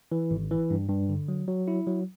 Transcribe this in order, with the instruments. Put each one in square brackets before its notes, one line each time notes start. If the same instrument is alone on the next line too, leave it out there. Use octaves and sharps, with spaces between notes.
[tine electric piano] E3
G#1
E3
G2
G2
D3
F#3
F#3
E4
F#3